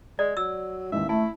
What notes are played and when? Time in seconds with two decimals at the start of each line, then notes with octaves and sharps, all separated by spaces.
0.19 G#3 D5
0.37 F#3 E6
0.92 A1 D#2 G#3 E5
1.09 A3 E4 A5